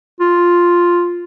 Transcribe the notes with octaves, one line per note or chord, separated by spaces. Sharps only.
F4